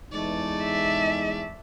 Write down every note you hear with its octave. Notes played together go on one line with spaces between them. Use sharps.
E2 G#3 A3 D#4 D5
E5